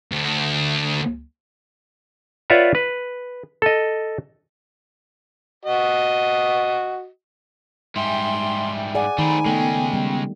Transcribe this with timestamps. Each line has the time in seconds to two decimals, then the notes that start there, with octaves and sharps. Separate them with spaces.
0.11 D2
2.50 F4 B4 C#5 D5 E5 F#5
2.75 B4
3.62 A4 D#5
5.65 F#4 D#5
7.96 G#2 G3 E5 G5 G#5 C6
8.95 G#4 D5 F#5 G#5
9.18 D#3 A3 C4 A#5 B5
9.46 C#3 G#3 A3 B3 G5
9.93 G3